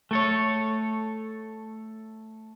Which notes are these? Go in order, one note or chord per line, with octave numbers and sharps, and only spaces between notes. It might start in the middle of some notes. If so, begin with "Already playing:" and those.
A3 A4 C#5